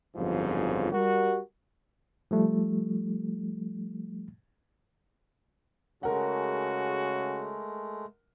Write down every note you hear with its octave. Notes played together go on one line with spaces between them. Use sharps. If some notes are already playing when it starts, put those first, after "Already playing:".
G1 F2 G#2 C#3 F3 F#3
G3 F#4 A#4
F3 G3 A3
C#3 G#3 A3 F#4 A#4 F#5